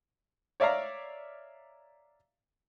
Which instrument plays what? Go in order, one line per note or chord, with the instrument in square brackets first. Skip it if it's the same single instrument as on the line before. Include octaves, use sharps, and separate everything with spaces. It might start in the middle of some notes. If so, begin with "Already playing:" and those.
[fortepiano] C#5 D5 E5 F5 A#5